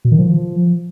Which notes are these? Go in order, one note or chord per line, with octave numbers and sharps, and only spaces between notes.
B2
D#3
F3